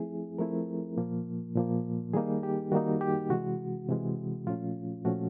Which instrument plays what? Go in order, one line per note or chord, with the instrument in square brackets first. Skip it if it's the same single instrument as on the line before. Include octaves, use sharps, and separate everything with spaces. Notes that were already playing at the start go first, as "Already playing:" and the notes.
Already playing: [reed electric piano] F3 A3 C4 E4 G#4
F3 A3 C4 E4 A#4
A#2 F3 A#3
A#2 F3 A#3
D#3 G3 A#3 D#4 G#4
G4
D#3 G3 A#3 D#4 F#4
G4
C3 E3 G#3 F#4
C3 E3 G#3
A#2 F3 A3 C#4 F4
A#2 F3 A3 C#4 F#4